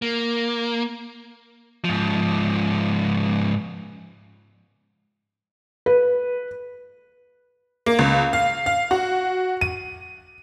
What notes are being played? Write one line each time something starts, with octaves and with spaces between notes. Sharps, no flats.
A#3
G#2 F3
B4
A#3
C#2
F5
F5
F#4
D#7